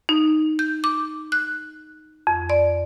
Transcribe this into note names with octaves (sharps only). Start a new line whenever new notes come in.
D#4
G6
D6
F#6
F2
D5